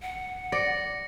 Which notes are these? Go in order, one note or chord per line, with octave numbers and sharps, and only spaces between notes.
F#5
D5 A#6 C#7